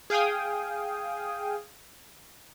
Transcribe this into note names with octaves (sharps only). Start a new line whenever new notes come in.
G#4 F5 G5 G#5 D#6